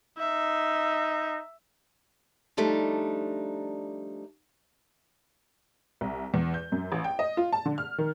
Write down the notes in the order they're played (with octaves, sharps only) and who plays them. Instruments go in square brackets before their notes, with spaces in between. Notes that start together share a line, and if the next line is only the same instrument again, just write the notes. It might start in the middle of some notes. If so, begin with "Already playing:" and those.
[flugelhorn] D#4 [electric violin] E5
[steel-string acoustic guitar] F3 G3 A3 D4 D#4
[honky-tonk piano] C2
E2
G6
F#2
A1
G5
D#5
F4
A5
D3
F6
D#3